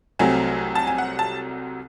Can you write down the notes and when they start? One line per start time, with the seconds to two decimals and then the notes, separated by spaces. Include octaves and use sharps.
0.19 C2 C3 F#3 A3 C4 G#5
0.75 A5
0.87 G#5
0.98 F#5
1.19 A5